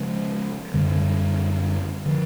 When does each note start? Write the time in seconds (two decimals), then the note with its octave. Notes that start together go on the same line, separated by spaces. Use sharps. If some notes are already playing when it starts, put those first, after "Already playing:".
Already playing: C#3 F3 G#3
0.74 F#2 D3 G3
2.06 D3 F3